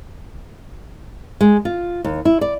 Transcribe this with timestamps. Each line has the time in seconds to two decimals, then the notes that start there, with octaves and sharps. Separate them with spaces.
1.41 G#3
1.65 F4
2.04 D#2
2.25 E4
2.41 D5